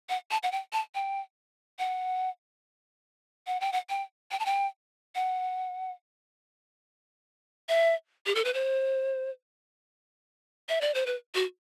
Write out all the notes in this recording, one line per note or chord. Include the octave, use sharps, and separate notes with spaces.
F#5
A5
F#5
G5
A5
G5
F#5
F#5
G5
F#5
G5
G5
A5
G5
F#5
E5
G4
A4
B4
C5
E5
D5
C5
B4
F#4